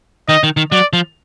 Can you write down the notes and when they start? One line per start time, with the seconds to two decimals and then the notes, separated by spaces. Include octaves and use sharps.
0.28 D#3 D#5
0.43 D#3
0.57 D#3
0.72 F#3 D5
0.93 F3